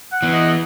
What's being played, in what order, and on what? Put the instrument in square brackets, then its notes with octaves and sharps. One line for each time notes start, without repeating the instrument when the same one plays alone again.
[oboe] F#5
[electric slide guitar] E3 B3
[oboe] D#5